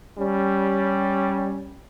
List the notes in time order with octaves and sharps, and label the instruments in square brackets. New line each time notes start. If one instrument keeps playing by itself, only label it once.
[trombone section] G3 C#4